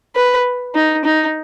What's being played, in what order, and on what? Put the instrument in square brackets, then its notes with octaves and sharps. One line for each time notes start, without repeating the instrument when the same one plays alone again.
[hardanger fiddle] B4
D#4
D#4